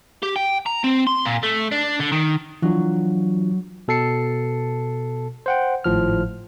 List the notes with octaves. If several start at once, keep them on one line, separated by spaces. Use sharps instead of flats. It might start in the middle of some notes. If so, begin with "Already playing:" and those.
G4
G5
A#5
C4
C6
A#2
A3
D4
D3
D#3
E3 F#3 D4 F4
B2 A4 A5 C7 C#7
C5 F#5 G5
G#1 A2 F3 F6